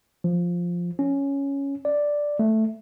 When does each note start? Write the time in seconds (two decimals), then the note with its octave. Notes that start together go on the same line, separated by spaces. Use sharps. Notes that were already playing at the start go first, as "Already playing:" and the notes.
0.24 F3
0.99 C#4
1.85 D5
2.39 A3